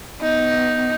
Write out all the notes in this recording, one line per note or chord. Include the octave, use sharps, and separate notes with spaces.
B3 D#4